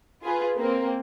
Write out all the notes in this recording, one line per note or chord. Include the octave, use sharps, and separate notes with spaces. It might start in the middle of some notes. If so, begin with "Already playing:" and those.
F4 G#4 B4
A#3 C4